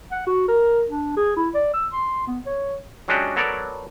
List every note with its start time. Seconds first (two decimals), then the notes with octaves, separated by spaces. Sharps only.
0.11 F#5
0.27 F#4
0.48 A#4
0.90 D4
1.17 G#4
1.37 E4
1.54 D5
1.74 E6
1.92 C6
2.27 B3
2.46 C#5
3.08 F#3 G#3 C#4 D4 F#4 G4
3.36 F#3 B3 A4 A#4 C#5 D5